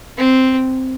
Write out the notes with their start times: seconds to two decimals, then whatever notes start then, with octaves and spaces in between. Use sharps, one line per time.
0.18 C4